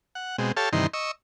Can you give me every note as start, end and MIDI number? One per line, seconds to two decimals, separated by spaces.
0.15 0.36 78
0.38 0.52 47
0.38 0.52 56
0.38 0.52 60
0.57 0.69 67
0.57 0.69 69
0.57 0.69 73
0.57 0.69 77
0.57 0.69 81
0.73 0.87 43
0.73 0.87 48
0.73 0.87 51
0.73 0.87 52
0.73 0.87 63
0.73 0.87 84
0.94 1.11 75
0.94 1.11 85
0.94 1.11 88